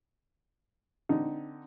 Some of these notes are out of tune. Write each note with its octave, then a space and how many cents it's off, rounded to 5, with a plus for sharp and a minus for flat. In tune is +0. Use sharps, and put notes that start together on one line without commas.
D3 +0 C4 -15 D#4 +0